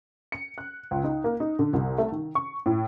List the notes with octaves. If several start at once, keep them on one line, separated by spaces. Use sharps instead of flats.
C#7
F#6
C#2
D#4
A#3
D#4
D3
C2
A3
D#3
C#6
A2